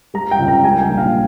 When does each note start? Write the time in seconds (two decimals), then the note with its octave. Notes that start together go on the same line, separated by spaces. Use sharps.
0.14 G3 A#5
0.31 G5
0.39 C#2
0.48 A#5
0.64 G3 G#5
0.81 G5
0.90 A#1
0.98 F5